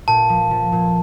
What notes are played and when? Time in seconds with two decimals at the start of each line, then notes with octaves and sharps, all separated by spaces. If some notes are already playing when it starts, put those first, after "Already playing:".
0.07 A#2 A5
0.29 F3
0.51 F3
0.72 A#2